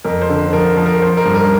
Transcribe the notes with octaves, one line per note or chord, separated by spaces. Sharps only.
F2 A#4
C5
D3
F3 A#4
F3
A#4
F3 C5
A#4
G2
A#4